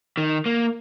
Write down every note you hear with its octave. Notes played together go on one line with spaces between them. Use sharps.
D#3
A#3